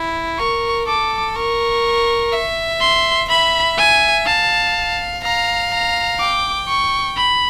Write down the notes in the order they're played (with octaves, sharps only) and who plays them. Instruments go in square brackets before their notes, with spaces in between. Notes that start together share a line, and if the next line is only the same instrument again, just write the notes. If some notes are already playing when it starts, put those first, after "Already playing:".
Already playing: [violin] E4
[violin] A#4 [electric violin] C#6
[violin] A4 [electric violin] D6
[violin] A#4 [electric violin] C#6
[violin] E5
[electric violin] C6
[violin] E5 [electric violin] B5
[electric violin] G#5
[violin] F5 [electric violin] A5
[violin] F5 [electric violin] A#5
[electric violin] A#5
[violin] G5 [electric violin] D6
[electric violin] C#6
B5